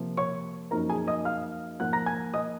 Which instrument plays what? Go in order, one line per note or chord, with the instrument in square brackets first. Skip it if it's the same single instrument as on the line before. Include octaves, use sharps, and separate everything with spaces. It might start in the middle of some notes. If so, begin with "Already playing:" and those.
Already playing: [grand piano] C3 F3 A#3
C#5 C#6
F#2 F3 A#3 D#4 A#4 A#5
G#4 G#5
D#5 D#6
F5 F6
G#2 F3 A#3 F#5 F#6
A#5 A#6
G#5 G#6
D#5 D#6